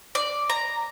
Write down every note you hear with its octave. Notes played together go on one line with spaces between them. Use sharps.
D5
A#5